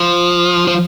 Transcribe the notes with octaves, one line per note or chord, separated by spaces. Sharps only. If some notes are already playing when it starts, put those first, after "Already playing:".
Already playing: F3
F3